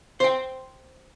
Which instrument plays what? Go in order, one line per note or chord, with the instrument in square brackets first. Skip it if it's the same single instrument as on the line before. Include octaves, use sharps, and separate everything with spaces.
[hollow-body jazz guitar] C5 G5